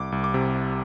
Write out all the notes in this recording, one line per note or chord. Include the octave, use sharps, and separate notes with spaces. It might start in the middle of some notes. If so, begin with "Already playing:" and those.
Already playing: C2 D6
C2
D6
C3